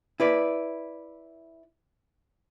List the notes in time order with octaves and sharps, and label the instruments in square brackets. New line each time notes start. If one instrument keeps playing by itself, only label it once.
[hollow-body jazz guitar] E4 B4 D5